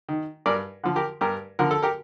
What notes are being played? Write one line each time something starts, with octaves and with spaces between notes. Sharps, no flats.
D#3
G2 A#4 D5
D3 F3
G4 A#4
G2 G4 A#4
D3 F3 A#4
A4
G4 A#4